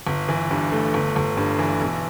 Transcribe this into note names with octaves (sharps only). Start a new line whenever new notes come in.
G1
E3
G2
A3
G1
G1
G2
E3
B1